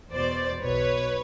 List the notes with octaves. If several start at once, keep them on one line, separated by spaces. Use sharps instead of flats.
E2 B2 C5 D5
B1 B2 B4 C#5